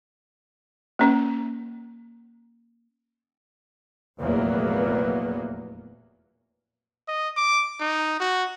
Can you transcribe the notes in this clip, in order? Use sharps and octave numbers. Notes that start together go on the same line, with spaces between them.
A#3 C#4
F1 A#1 E2 F#3 A#3 B3
D#5
D6
D#4
F#4